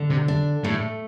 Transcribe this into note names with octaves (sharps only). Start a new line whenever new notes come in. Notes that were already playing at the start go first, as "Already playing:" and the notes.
Already playing: D3
C3
D4
A2 A3